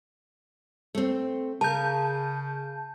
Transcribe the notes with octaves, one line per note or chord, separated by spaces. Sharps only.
A3 C4
C#3 A#4 A5 G6